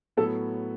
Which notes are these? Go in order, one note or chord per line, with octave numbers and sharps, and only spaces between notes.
A2 F#3 B3 A4